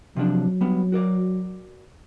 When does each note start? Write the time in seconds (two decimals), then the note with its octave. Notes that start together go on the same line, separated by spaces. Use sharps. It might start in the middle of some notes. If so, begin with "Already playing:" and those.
0.16 C3 F3 F#3 D4
0.61 G3 B3
0.92 F#4 A#4 D5